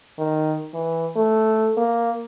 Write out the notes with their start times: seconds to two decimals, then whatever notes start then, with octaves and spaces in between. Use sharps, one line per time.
0.19 D#3
0.74 E3
1.16 A3
1.77 A#3